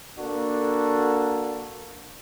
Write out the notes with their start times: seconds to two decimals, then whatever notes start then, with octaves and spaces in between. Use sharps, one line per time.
0.19 A#3 D4 F#4 A4